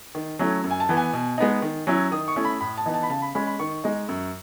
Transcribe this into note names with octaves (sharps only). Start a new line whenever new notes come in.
D#3
F#3 A3 C#4 E4
F#2
G#5
A5
E3 B3
G#5
B2
G#3 B3 D#4
D#3
F#3 C#4 E4
D#3 D#6
C#6
A3 C#4 E4
B5
A2 B5
A5
E3 B3 D#4
A5
B5
C#3 A5
B5
G#3 C#4 B5
B5
D#3 C#6
G#3 D#4
F#2